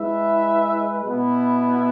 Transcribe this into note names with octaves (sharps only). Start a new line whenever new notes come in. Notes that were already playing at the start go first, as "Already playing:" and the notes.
Already playing: G#3 E4 B4 E5
B2 B3 E4